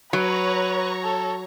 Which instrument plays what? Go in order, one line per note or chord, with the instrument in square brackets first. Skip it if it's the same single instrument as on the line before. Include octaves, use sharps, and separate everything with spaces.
[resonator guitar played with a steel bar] F#3 [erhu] B4 [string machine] C#5 A#5 C#6
[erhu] A4